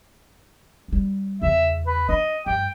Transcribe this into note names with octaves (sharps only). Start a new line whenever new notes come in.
G3 D4
E2 C#3 E5
B4
D4 D#5
G2 G5